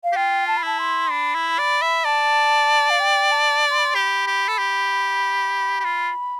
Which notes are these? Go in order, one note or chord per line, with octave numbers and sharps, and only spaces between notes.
F5
G4
F4 G5
A5
B5
E4 A5
C6
D4 B5
E4
D5
E5
D5 A5
F5
G5
A5
C6
B5
C6
G4 B5
G4
A4
G4
G4
F4